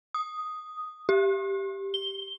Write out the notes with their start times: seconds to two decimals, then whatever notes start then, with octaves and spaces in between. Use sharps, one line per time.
0.14 D#6
1.09 G4
1.94 G7